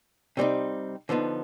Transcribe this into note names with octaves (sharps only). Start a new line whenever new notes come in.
C3 G3 C4 D#4
D3 F3 B3 D#4